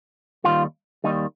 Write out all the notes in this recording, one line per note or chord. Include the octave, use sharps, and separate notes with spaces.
D#2 D#3 G3 F4
D#2 D#3 G3 D#4